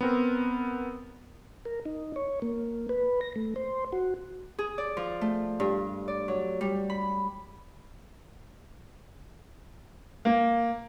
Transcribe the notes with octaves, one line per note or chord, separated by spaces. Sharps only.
B3 C4 A#4
A#4
D#4
C#5
A#3
B4
A#6
A3
C5
F#4
G#4
D5
F3
A3
G2
D5
F#3
G3
B5
A#3